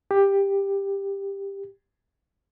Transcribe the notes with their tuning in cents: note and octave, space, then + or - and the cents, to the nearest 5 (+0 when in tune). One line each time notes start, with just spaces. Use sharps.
G4 +15